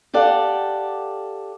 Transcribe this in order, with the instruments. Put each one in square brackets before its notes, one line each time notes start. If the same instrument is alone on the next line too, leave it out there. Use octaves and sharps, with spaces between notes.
[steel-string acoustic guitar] G4 A4 D5 F5 F#5